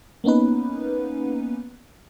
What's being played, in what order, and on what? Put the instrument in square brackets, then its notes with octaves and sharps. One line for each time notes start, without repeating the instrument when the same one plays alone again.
[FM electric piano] A#3 B3 C#4 D#4 B4